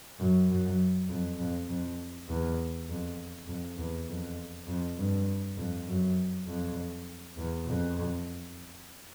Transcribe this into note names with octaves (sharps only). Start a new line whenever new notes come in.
F#2
F#2
F2
F2
F2
E2
F2
F2
E2
F2
F2
G2
F2
F#2
F2
E2
F2